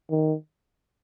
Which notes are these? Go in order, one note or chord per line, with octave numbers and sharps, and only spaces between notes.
D#3